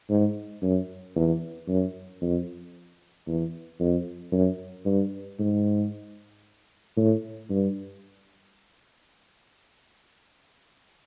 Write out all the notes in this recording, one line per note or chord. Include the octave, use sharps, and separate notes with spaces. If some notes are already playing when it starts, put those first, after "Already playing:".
G#2
F#2
E2
F#2
F2
E2
F2
F#2
G2
G#2
A2
G2